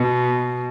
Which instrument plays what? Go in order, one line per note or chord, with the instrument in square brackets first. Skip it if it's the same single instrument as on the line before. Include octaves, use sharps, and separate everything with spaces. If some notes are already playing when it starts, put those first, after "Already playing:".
Already playing: [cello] B2